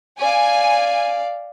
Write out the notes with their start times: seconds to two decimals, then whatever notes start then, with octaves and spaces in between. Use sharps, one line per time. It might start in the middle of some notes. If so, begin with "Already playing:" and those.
0.19 D5 F5 G#5